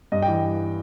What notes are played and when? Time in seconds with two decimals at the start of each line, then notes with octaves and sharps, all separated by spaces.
0.12 G2 D#5
0.22 G5
0.28 E3